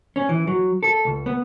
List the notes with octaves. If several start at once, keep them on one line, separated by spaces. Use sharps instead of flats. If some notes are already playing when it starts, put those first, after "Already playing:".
C#4
E3
F#3
A4
C#2
B3